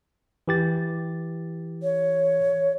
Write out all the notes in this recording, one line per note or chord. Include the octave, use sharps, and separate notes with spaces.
E3 G4 A6
C#5